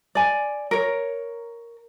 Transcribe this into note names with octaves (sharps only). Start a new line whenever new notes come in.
D5 G#5
A#4 C#5